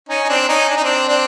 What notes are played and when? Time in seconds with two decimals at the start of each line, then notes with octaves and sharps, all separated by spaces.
0.09 C#4 D#4
0.24 D#4
0.29 C4 D4
0.49 C#4 D#4
0.69 D4
0.76 D#4
0.83 C4 D4
1.08 C4 D4